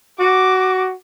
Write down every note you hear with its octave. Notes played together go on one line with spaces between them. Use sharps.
F#4 D6